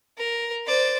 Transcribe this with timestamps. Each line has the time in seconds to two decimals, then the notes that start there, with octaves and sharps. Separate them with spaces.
0.18 A#4
0.66 C5 D5